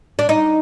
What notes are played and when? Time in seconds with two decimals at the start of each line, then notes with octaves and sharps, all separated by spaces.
0.19 D4
0.29 D#4